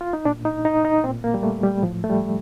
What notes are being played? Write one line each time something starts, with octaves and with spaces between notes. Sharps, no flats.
F4
D#4
A#2 D4
D#4
D#4
D#4
A#2 C4
A#3
G3
A3
G3
A2 F3
A3
G3